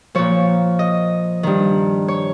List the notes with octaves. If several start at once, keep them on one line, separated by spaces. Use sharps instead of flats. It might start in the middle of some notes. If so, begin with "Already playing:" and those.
A#2 F3 C#5
D#5
G2 D#3
C#5